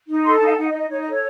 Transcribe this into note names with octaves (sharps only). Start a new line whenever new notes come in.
D#4
A4 C6
A5
D#4
F5
A5
D#4 F#5
D#5
D#4
D#5
D#4 C#5
D#5
A4 C#5